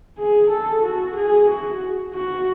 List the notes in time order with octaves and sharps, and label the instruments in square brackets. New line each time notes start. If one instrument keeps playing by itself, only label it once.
[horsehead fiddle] G#4
A4
F#4
G#4
F#4
F#4